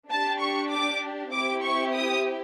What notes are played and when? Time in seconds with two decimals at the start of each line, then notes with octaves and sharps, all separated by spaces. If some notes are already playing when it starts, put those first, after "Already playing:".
0.11 D4 G4 A5
0.41 C#6
0.71 D6
1.32 C4 E4 G4 D6
1.63 C#6
1.94 D#6